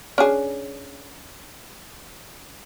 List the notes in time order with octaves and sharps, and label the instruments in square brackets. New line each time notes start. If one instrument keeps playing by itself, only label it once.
[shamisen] C#4 D4 G#4